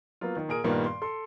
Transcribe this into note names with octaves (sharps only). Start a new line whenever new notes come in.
F#3 A#3 B3 F4
D#3
A#2 G#4 A#4 D#6 D7
G2 A#2 D#3 G3 A#3 B3
C6
A4 C6